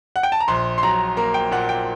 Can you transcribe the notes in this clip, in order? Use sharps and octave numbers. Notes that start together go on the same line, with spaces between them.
F#5
G5
A5
A#5
A#1 C6
C6
F#3 A#5
A#3 A#5
G5
A#2 F#5
G5